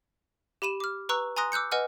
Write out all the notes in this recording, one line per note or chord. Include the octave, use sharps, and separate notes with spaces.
G4 B5 D#7 E7
D6 F6
B4 A#5 C#6 E6 F#6
G#5 A#5 C6 D#6 F#6 A#6
D6 E6 F#6 G6 C#7
B4 D#5 F#5 G#5 F6